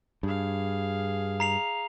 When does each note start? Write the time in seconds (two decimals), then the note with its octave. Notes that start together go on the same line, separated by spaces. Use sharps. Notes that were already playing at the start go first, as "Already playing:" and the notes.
0.23 G2 G#4 F5
1.40 A#5 C7 F7